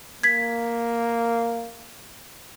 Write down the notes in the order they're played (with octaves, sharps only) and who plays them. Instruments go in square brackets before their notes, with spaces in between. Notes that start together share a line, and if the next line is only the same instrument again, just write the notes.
[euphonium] A#3 [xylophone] G#6 B6